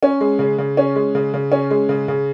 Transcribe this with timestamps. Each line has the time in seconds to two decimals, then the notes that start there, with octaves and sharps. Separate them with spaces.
0.03 C#4
0.21 G#3
0.39 C#3
0.58 C#3
0.77 C#4
0.96 G#3
1.15 C#3
1.34 C#3
1.52 C#4
1.71 G#3
1.89 C#3
2.08 C#3